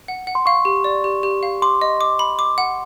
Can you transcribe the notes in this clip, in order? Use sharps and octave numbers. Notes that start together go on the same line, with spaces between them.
F#5
F#5
C6
F5 C#6
G4
D5
G4
G4
F5
C6 D6
D#5
D6
B5
D6
F#5